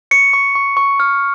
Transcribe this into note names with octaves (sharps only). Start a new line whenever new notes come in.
C#6 C#7
C#6
C#6
C#6
F6